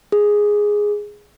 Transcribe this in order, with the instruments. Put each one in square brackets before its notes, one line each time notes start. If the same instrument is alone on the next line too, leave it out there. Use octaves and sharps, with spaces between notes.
[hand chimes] G#4